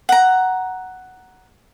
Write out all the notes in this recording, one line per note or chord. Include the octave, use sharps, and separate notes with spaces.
F#5 A#5